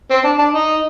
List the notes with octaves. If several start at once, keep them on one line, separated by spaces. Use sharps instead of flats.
C4
D4
D4
D#4